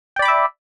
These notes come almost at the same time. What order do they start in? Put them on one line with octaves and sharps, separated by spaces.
G5 D5 B5 D6 E5